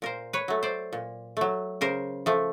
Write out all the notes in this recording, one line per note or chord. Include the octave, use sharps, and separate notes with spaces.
A#2 A#4 C5
B4 C#5
F#3 A3
C5 D5
A#2
F#3 A3
C#3 A#4 C5
F3 A3